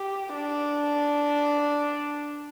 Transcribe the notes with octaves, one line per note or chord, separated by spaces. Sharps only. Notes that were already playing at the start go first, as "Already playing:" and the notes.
Already playing: G4
D4